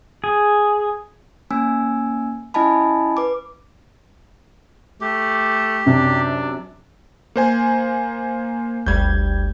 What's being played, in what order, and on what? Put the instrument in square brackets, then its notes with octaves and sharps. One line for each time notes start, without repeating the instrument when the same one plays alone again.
[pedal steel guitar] G#4
[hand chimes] A#3 C#4 G#5 E6
C#4 E4 D#5 G#5 A5 B5
B4 D6
[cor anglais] A3 [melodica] G4
[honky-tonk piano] F#2 C3 [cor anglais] D4
[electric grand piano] A#3 C5 G#5
[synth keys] G1 D2 G3 [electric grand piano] G6 G#6